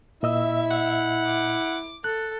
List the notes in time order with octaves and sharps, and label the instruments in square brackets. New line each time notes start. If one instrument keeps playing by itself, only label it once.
[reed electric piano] A#2 D#5 E6 [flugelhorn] E4 [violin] E5
[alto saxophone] F#5
[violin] D6
[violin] A4 [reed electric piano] F#6